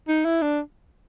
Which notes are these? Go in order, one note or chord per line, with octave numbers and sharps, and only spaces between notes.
D#4
E4
D4